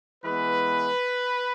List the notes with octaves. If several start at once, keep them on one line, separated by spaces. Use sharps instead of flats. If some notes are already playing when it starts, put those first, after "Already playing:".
E3 G#3 B3 B4